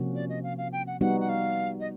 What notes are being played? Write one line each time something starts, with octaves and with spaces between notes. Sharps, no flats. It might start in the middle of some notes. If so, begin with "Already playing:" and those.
Already playing: C3 F3 A#3 C#4 F#4
D5
D#5
F5
F5
G5
F#5
G3 B3 D#4 F#4 F#5
F#5
F5
D#5